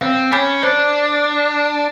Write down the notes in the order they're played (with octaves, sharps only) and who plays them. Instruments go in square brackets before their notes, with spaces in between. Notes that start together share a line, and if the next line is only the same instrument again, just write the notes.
[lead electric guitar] C4 [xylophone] F5
[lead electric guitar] C#4 [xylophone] G#5 B5 D6 G6
[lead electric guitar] D4 [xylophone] C5